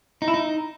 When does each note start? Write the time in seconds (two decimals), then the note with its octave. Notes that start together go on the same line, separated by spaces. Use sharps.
0.22 D#4
0.28 E4
0.34 D#4